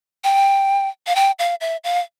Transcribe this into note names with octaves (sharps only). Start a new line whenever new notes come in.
G5
F5
G5
F5
E5
F5